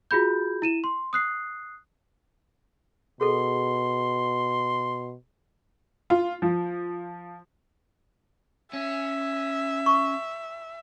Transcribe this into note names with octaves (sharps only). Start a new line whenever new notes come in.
F4 F#4 G#4 B5 G6
E4 D#7 E7
C6
D#6 F#6 C7
B2 G#4 A4 C6
F4
F3
C#4 E5
C#6